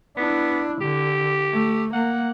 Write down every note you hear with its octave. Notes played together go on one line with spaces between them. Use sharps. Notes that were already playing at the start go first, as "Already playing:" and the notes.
B3 D4 E4
D3 G4
A3
A#3 F#5